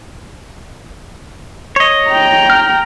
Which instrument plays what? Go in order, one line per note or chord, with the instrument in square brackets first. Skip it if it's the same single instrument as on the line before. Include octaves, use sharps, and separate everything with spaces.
[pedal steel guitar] C#5 D#5
[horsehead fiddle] G5 A#5
[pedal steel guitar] F6